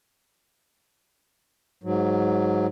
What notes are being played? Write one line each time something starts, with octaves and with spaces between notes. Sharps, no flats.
G#2 F#3